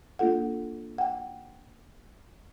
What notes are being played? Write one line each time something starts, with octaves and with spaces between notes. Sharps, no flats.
A#3 D4 F4 A4 F#5
F#5 G5